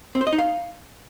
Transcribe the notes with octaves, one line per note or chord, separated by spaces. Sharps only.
C4
C5
D#5
D#4
F5